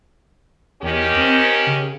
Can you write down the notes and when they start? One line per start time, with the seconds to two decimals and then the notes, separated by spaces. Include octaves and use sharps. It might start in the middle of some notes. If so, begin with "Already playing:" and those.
0.83 E2 D#3 C#4 G4
1.17 C4
1.67 C#3